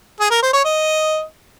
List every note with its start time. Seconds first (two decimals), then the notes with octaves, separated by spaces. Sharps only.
0.20 G#4
0.31 A#4
0.42 C5
0.53 C#5
0.65 D#5